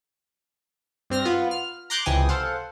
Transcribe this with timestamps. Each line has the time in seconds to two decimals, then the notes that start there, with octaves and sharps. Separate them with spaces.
1.10 G2 C4 F6 A#6
1.25 B3 F4 B4
1.51 F6
1.90 A#5 C6 D6 F#6 G6 A6
2.06 C#2 C3 E3 G5 G#5 D#6
2.29 A4 C5 F5 F#5